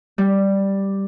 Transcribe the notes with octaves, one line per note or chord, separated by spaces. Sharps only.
G3